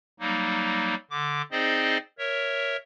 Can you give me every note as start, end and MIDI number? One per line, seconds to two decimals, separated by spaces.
0.20 0.95 54
0.20 0.95 55
0.20 0.95 58
0.20 0.95 63
1.11 1.42 50
1.11 1.42 86
1.52 1.98 60
1.52 1.98 63
1.52 1.98 68
1.52 1.98 72
1.52 1.98 74
1.52 1.98 75
2.18 2.76 70
2.18 2.76 73
2.18 2.76 76